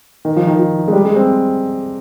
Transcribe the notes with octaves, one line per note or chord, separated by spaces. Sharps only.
D#3
F3
D#3
F3
G#3
G3
G#3
C4